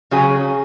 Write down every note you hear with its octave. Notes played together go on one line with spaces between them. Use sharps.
C#3 F#3 C#4 G#4